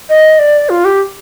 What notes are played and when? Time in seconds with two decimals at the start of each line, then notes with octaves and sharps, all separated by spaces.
0.09 D#5
0.39 D5
0.70 F4
0.85 G4